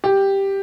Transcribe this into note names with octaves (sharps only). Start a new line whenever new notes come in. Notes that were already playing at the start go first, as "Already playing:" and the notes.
G4